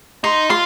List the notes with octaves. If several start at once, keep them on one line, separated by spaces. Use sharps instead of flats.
D#4 C6
F4 C6